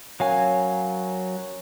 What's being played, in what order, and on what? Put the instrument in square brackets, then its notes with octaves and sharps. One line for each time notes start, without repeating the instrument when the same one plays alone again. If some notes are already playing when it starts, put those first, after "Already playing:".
[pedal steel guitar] F#3 F5 G#5 [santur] A#3 C#4 F#5